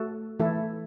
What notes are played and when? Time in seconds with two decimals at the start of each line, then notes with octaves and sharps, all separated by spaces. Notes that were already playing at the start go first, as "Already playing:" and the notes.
Already playing: A3 F#4 A4
0.39 E3 A3 E4 A4